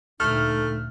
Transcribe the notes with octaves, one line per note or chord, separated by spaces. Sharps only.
D2 A#2 A3 D#4 F6